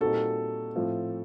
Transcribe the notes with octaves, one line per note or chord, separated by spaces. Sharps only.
A#2 G3 C4 D#4 F#4 A4
A2 F3 A3 C4 F4